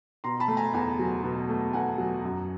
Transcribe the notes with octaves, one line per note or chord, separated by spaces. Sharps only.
B2 A#5 C6
A5 B5
A3
G#5 A#5
E2 G#5 A#5
F#3
B2
A3
E2 F#5 G#5
F#3
F#2